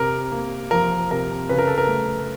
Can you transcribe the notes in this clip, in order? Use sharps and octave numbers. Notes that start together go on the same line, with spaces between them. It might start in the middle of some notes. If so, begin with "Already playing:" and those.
Already playing: C3 A#4
A#3
F3 A#4
C3 A#4
C#3 B4
A#4
A4
A#4
A3